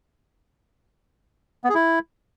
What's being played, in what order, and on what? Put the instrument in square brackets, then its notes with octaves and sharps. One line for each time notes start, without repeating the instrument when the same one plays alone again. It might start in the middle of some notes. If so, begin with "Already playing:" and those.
[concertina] B3
G#4
E4